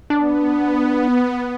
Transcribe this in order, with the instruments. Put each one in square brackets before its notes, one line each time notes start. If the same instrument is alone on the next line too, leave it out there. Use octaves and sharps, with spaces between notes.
[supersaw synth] B3 [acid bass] D4